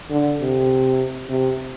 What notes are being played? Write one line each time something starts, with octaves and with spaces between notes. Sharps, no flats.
D3
C3
C3